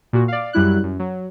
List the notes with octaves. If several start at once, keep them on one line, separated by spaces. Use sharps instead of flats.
A#2 F#4
D5 F5
F#2 G3 E4 F#6
F#2
F#3